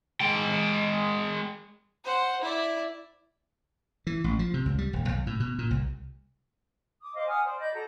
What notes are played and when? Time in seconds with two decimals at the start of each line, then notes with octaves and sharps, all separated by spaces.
0.20 G#3 G5
2.05 C5 F#5
2.42 E4 D5
4.07 E3
4.24 A1
4.39 F3
4.54 C3
4.66 C#2
4.78 G3
4.93 D#1
5.09 B1
5.27 A2
5.40 B2
5.58 A#2
5.71 C2
7.01 D6 D#6
7.14 C5 D#5 F5 D6
7.27 F#5 G#5 D#6 F6
7.44 C5 D5
7.59 D5 D#5 B5 G6
7.73 F#4 A4 A#5